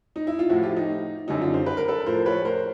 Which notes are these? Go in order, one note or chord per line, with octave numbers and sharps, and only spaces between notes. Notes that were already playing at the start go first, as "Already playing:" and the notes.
D#4
E4
F4
A2 F3 E4 F#4
F4 G4
D#4
F#2 D3 G3 D#4
D#4 F4
C5
B4
A#4
A4 B4
A2 F3 A#4 C5
B4 C#5
A#4 C5